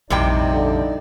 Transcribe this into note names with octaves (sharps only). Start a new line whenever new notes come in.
A#1 F2 C3 G3 D#4 E4 D5 G5
D3